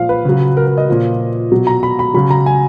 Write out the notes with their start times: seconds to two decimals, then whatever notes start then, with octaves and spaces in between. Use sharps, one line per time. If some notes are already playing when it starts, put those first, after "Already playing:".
Already playing: A#2 F3 F5
0.09 B4
0.25 C#3 F#3
0.57 A#4
0.67 A#4
0.78 D#5
0.88 A#2 F3
1.52 B2 F#3
1.67 A#5
1.83 B5
1.99 B5
2.14 C#3 F#3 B5
2.31 A#5
2.46 G#5